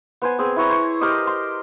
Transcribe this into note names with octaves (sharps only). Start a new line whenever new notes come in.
B3 C5 G#5
C4 G#4
E4 B4 C#5 A#5
C5 C#5
G4 A#4 C5 D#5
C6